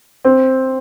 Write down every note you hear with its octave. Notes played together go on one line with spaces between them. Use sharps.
C4